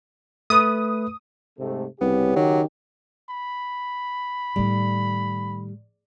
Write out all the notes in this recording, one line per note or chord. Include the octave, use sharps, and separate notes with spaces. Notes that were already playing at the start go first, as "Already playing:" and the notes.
A3 B4 D#6
G#2 C3 A3
C2 C#3 B3 C#4 G4
D#3 F#3
B5
A2 D#3 G3